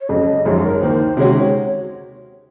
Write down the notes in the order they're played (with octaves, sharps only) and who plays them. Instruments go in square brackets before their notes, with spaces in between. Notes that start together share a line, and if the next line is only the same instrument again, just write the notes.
[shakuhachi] C#5
[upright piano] F2 C#3 F#3 [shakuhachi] D#5
[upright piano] G#1 F#2 F3 G#3 [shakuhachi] C#5
[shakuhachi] A#4
[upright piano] D#2 D#3 A#3 [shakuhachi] C5
[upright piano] C3 D#3 G#3 C#4 F#4 [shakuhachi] C#5